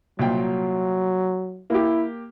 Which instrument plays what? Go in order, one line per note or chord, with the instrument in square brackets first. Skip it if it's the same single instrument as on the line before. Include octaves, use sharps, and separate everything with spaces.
[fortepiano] C2 A#2 G5 [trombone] F#3
[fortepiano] A#3 G4 [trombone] E4